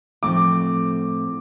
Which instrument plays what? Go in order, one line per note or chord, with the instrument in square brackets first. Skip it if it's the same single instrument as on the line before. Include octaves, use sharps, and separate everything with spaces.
[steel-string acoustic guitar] A2 F3 A3 C4 [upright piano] D6